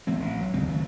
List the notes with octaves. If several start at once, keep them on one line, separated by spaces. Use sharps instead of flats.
F3 A3 A#3 C4
A1
F#3
D#2 C#3 G#3 C4
F#1 D#3 F#3 A3